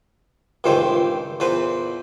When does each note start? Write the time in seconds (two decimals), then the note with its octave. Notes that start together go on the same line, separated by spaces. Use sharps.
0.64 C#2 G2 A#2 D#3 E3 C5
1.40 E2 A#2 B4 C5